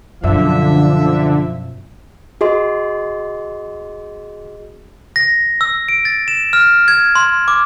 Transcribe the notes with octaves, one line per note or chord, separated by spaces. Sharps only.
F#2 B2 D3 F3 E5
F#4 G#4 D#5 C6
A#6
E6
D7
A6
E7
F6
G#6
C6
D6